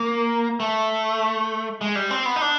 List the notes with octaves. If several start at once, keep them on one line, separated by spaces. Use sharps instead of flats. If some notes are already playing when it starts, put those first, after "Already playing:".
Already playing: A#3
A3
G#3
G3
C4
B3
D#4
D4